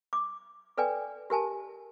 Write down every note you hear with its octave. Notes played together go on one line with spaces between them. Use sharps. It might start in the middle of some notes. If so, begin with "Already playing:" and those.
D6
A4 B4 D5 G5 G#5
G4 A#4 G#5 A5